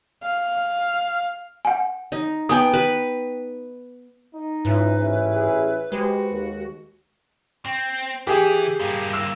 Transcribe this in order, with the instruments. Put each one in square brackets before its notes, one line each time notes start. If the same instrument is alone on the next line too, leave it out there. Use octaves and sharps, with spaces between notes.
[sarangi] F5
[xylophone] F#5 G#5
[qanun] D#4
[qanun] B3 G5 [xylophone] G#5 D#6
[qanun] B4
[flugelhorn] D#4
[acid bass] G#2 [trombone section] F3 C#4 E4 [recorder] B4
[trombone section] A1 C#4 E4
[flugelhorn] G#4
[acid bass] G#3 [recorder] F#4 [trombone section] G4 C5 [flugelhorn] B4
[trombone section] D#2
[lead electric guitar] C4
[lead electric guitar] E3 [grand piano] G4 G#4
[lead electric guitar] G2 A#3
[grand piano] E6